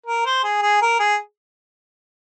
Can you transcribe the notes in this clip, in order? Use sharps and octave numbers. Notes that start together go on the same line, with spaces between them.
A#4
C5
G#4
G#4
A#4
G#4